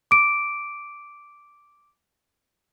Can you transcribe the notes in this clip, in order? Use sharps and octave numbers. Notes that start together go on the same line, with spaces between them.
D6 D7